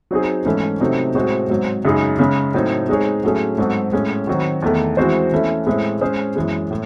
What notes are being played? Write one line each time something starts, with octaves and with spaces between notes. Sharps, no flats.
F#3 C4 D#4 G#4
G#2 E3 A3 C#4 E4
C3 F#3 A3 C4 D#4
A2 G#3 C4 F#4 C5
G#2 F#3 C4
F#2 C#3 G#3 D#4 G#4
C#3 G#3 C#4
A2 F#3 C4 D#4
G#3 C4 D#4 G#4 C#5
A2 F#3 A3 C#4 G#4
G#2 F#3 C4 F#4 A4
A2 G#3 C#4
D#3 F#3 C4 F#4
E2 D#3 A3
E3 G#3 C4 F#4 C5
E3 A3 C#4 E4
A2 G#3 C4 E4
G#3 C#4 G#4 C5
F#2 E3 G#3
A2